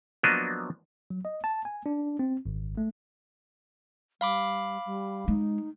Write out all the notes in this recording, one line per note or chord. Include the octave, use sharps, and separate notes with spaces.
F3 F#3 A#3 B3 D4 D#5
F#3
D#5
A5
G#5
D4
C4
G#1
A3
G3 F5 B5 D6
G3
G#3 D#4